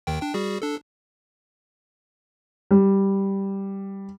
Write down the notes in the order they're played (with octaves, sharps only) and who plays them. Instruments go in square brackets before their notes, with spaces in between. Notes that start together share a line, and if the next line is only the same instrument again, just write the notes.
[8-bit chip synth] D#2 D#3 G5
D4 G5
G3 F#4 G#4
D4 A4
[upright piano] G3